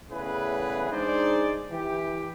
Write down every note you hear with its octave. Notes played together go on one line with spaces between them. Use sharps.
E2 A2 C#3 E3 G#4 B4
G#3 D4 D#4 G#4 C5 D5
E3 G4